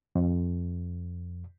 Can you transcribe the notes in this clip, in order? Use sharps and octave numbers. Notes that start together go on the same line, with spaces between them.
F2